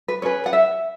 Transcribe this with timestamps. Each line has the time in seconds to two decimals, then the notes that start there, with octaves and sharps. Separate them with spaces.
0.08 B4
0.22 C#4 G#4 B4 C#5
0.46 F#5
0.53 E5